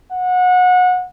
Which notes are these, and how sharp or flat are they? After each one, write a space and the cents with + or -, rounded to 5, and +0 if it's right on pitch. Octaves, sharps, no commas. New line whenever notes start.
F#5 -25